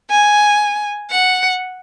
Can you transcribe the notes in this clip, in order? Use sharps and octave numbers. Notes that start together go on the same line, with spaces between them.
G#5
F#5